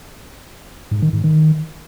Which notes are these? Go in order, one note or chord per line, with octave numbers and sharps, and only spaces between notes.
G#2
D#3
G#2
D#3